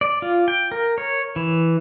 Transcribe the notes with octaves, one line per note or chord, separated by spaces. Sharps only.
D5
F4
G5
A#4
C#5
E3